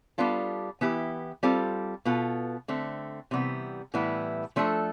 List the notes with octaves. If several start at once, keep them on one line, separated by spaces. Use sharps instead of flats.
G3 B3 D4 F4 A4
E3 B3 E4 G4
G3 C4 F4 A4
B2 B3 F4 A4
D3 A3 C4
C3 E3 G3 B3
A2 E3 G3 B3 E4
F3 A3 D4 A4